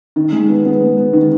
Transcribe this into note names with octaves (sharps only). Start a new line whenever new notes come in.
D#3
G#3
B3
B3
G#3
B3
D#3